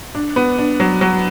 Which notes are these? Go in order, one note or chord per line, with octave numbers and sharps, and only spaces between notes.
D4
B3
D4
F#3
F#3